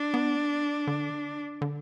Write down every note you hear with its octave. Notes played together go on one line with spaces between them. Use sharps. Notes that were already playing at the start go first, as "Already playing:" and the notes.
Already playing: D4
B3
D3
D3